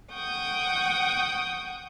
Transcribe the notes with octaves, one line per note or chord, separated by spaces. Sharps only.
F#5 G5 C#6 D#6 G6